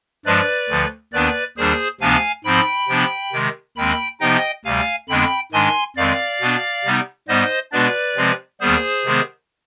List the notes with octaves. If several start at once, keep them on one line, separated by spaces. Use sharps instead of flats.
G2 F3 G#3 D4 B4 D5
D2 D3 F3
D#2 D#3 B3 D4 B4 D5
D#2 D#3 G3 D4 G#4 C5
D2 C3 F3 B3 D4 F5 G#5
G#2 F3 C4 G5 B5
C3 F3 B3 D4
C3 D#3 G#3
D#2 D#3 G#3 C4 G5 B5
C3 F3 B3 D#4 D#5 G5
D2 C3 G3 F5 G#5
F2 D3 G#3 B3 D4 G5 B5
G#2 D#3 G#3 D4 G#5 C6
F2 D#3 G#3 C4 D5 F5
B2 B3 D4
C3 G3 B3 D#4
G#2 G3 B3 C5 D#5
B2 G#3 B3 D4 B4 D5
C3 F3 G#3 C4
D#2 D#3 G3 B3 G#4 C5
C3 D#3 G#3 B3